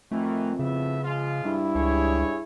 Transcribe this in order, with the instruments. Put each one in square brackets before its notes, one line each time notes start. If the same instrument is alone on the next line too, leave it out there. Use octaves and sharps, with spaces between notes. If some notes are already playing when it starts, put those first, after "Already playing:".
[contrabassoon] F2 [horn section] D#3 E3 [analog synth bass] A3
[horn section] A2 B3 E5 [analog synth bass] C#3
[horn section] F3 G#3 F4
[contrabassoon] G2 [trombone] E4
[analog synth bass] C#2 [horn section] G3 G#4 C#5